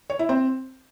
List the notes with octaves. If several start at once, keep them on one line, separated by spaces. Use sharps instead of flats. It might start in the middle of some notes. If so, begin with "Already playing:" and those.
C#5
E4
C4